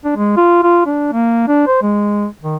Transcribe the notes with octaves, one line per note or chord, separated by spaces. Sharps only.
D4
G#3
F4
F4
D4
A#3
D4
C5
G#3
D#3